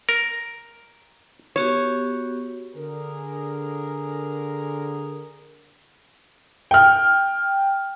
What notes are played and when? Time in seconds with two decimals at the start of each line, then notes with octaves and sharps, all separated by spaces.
0.09 A#4
1.56 B3 F#4 G4 C#5
2.74 D3 G#4 A#4
6.71 G5 F6